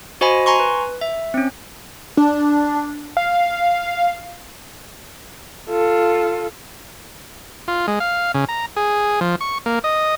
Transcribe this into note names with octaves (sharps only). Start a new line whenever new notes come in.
F#4 C5 D#5 G#5 B5
G#5 A#5 C6 C#6
B4
E5
C4 C#4
D4
F5
F4 A4
F4
G#3
F5
C#3
A#5
G#4
F3
C#6
A#3
D#5